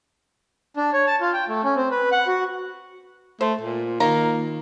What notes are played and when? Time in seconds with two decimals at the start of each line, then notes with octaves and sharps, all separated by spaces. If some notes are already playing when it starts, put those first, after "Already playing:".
0.77 D4
0.93 C#5
1.07 A5
1.21 F4
1.33 G5
1.49 A3
1.64 C#4
1.76 C4
1.91 B4
2.12 F#5
2.27 F#4
3.41 A3 C5
3.61 A#2
4.00 D#3 A#3 F4 A#5